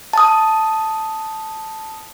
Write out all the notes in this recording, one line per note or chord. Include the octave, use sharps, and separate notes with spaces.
A5 D#6